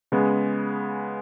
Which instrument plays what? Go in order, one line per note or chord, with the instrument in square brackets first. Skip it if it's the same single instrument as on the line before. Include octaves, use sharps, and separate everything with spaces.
[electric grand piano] C#3 G#3 B3